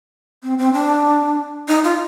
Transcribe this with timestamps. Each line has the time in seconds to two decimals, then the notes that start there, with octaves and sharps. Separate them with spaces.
0.43 C4
0.58 C4
0.73 D4
1.68 D#4
1.84 F4